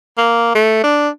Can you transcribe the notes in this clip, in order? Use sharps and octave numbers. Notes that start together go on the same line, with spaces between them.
A#3
A3
D4